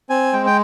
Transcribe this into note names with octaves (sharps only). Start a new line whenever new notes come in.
C4 G#5
G#3 G5
G5